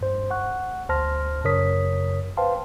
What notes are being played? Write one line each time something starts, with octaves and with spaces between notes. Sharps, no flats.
G2 C5
F#5 C#6 F#6
D2 C5 A5 C6 F6 A#6
F#2 C#3 A#4 C#5 D#6 B6
B4 C5 F5 G5 A5 C6